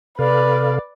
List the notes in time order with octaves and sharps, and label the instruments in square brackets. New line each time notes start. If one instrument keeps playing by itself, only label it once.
[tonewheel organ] C3 A4 F5 [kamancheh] B4 D5